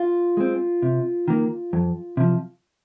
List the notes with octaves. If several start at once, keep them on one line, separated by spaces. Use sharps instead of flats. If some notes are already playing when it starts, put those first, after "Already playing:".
Already playing: F4
G#3 C4
C3
D#3 A#3
F2
C3 F3